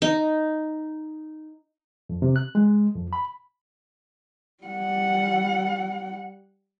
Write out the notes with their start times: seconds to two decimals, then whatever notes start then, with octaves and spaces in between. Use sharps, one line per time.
0.02 D#4
2.10 F2
2.22 C3
2.36 F#6
2.55 G#3
2.95 F2
3.13 B5
4.64 G3 F#5